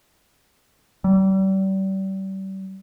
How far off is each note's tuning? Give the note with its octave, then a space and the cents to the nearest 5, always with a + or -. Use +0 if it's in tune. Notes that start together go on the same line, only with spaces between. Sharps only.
G3 -35